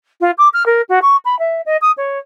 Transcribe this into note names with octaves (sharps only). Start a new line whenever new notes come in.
F4
D6
F6
A#4
F#4
C#6
B5
E5
D#5
D#6
C#5